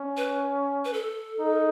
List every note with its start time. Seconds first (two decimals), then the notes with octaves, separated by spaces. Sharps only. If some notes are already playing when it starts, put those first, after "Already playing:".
Already playing: C#4
0.17 B4
0.85 B4
0.93 A4
1.40 D#4